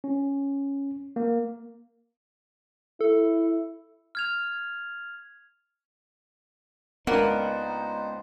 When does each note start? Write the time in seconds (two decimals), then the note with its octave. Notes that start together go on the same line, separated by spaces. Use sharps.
0.04 C#4
1.16 A#3
3.01 E4 A4
4.15 F6 G#6 F7
7.07 C#2 A#3 B3 D4 D#4 C5 F#5